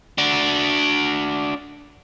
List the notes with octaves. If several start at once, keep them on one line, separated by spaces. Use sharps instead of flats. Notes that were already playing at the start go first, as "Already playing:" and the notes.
D4 F#4